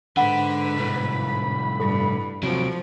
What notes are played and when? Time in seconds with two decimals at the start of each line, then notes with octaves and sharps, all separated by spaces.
0.17 G#2 D3 B4 F#5 B5
0.77 C2 A2
1.80 G2 A4
2.43 C3 F3 F#3 D7